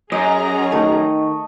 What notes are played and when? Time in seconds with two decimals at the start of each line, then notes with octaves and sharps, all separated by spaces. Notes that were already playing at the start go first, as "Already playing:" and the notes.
0.12 F#2 G#4 D#5 A#5
0.72 D#3 A3